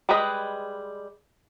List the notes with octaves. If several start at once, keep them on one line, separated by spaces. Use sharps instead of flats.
G3 G#3 G#4 B4 D#5